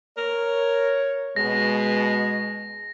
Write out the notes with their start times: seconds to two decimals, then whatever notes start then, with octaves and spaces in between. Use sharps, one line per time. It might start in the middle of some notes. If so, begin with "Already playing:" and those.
0.18 A#4 C#5
1.36 B2 G#3 A#6